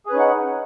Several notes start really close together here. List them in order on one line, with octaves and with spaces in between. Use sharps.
G#4 B4 C#4 D#4 F#5